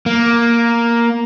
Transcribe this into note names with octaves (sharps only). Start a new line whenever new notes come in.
A#3